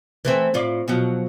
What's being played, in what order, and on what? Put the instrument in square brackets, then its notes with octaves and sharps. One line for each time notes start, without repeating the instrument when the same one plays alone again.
[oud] E3 A3 C4
A2 F4 D5
B2 F3 F#3